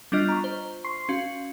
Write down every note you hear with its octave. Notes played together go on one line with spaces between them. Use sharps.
G3 B3 D4 F4 D#5 F6
A#5 C#6
C5
C6 C#6 C7
C#4 F#4 F5